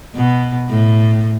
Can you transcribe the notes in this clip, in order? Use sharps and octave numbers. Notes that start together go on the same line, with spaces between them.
B2
A2